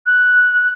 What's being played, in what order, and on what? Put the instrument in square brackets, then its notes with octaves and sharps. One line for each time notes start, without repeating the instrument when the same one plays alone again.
[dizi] F#6